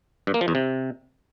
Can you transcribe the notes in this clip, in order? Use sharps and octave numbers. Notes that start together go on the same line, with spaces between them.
G2
A#3
F3
E2
C3